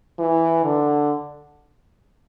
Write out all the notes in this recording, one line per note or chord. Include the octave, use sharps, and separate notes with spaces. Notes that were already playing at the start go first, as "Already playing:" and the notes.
E3
D3